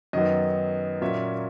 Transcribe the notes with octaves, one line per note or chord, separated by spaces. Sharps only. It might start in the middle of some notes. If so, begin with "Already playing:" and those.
F#2 D#3 F#3 B3 D#5
A#2 F#3 A#3 C#4 E5